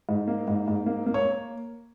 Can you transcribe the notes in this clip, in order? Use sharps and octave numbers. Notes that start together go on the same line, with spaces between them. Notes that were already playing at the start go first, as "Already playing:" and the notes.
G#2
A#3
G#2
G#2
A#3
A#3
C#5